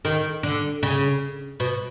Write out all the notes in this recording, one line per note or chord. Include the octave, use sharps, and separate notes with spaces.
D#3
D3
C#3
B2